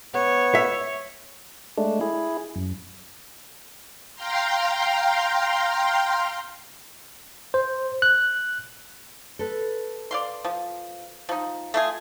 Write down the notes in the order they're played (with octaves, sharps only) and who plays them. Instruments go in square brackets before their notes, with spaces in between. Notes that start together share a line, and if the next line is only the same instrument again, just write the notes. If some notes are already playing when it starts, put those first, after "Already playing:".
[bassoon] B3 [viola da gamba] C#5
[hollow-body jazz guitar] E5
[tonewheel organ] G#3 A3 D4
E4 G#4
F#2
[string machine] F5 G5 A#5 C6
[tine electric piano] C5
F#6
[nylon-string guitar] A4 B4
[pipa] D5 F5 C6
F3
F3 D#4
A3 F4 G#4